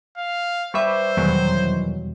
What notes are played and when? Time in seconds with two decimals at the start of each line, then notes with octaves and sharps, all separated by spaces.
0.17 F5
0.74 G3 B4 C5 E5 C#6 D6
1.17 E2 B2 D#3 E3 F#3 G3